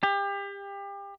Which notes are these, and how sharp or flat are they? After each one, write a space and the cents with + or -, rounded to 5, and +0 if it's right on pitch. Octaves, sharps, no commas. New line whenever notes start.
G4 +30